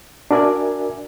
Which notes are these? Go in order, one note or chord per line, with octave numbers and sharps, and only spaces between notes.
D4 F#4 A#4 D5 E5 G#5